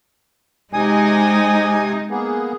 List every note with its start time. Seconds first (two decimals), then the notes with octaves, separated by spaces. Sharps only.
0.73 C3 G#3 D#4 G#5 D#6
2.11 A#3 B3 G#4